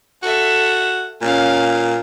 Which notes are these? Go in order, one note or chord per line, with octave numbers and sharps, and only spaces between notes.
F#4 A4 E5
A#2 C#4 F5